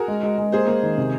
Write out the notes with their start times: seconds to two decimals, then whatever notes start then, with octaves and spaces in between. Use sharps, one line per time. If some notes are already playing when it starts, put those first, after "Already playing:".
Already playing: F#4 G#4 A#4
0.08 G#3
0.23 G#3
0.38 G#3
0.52 A#3 G#4 C5
0.67 A#3
0.83 D#3
0.98 C3